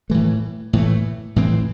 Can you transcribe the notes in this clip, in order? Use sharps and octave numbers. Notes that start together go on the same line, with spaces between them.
A2 E3 A3
A2 E3 A3
A2 E3 C4